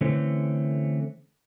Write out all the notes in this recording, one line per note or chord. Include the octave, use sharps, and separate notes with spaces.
D3 E3 A3 C4 C#4